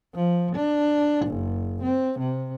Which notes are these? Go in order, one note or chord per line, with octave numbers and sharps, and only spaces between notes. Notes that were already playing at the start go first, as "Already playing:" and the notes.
F3
D4
F#1
C4
C3